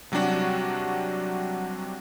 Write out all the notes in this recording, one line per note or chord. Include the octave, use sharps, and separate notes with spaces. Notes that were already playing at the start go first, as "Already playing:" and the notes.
C3 F#3 G3 D4 F#4